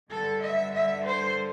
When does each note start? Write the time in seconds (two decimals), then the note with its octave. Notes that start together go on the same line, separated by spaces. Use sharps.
0.11 G2 D3 G3 A4
0.42 E5
0.73 E5
1.04 C5